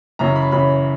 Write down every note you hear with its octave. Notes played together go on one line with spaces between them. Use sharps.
F#2 C#3 E3 A#5
B5
F#2 C#3 E3 B5